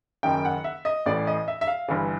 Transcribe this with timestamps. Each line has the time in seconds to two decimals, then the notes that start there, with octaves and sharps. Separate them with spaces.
0.23 F#1 F#2 D#3 G5
0.45 F#5
0.64 E5
0.85 D#5
1.06 A1 A2 E3 D5
1.27 D#5
1.48 E5
1.61 E5
1.67 F5
1.89 G1 G2 E3